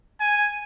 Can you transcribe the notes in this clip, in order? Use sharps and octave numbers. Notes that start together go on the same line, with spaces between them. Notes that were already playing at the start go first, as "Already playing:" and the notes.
G#5